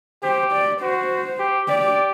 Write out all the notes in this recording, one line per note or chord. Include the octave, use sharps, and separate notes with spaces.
G4 C5
D5
F#4 C5
G4
G4 D5